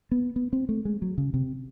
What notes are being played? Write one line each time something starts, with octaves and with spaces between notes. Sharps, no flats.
B3
B3
C4
A3
G#3
F#3
C#3
C3